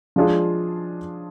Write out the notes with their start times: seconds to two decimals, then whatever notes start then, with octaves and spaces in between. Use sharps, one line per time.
0.16 F3 G#3 D4 F4 G#4